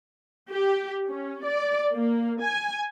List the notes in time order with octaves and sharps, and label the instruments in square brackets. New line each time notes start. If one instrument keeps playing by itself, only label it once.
[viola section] G4
C#4
D5
A#3
G#5